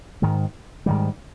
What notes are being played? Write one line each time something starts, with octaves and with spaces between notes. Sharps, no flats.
G#2 D#3 G#3
G#2 D#3 G3